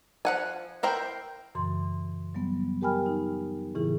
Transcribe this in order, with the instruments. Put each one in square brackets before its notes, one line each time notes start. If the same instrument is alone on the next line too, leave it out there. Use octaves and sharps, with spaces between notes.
[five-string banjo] F3 F#5 G#5
E4 A#4 C5 G5
[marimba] F#2 A#2 C#3 E3 C6
F#3 G3 B3
G4 A#4 G5 G#5 B5 F6
D#4
A2 C#3 E3 E4 G#4